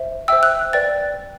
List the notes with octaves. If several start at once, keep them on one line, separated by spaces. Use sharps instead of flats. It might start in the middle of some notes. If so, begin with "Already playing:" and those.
Already playing: C5 E5
C5 E5 G5 E6
F#6
B4 D5 G5 A6